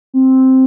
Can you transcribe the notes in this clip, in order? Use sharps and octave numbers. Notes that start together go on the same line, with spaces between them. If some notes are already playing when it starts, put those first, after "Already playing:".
C4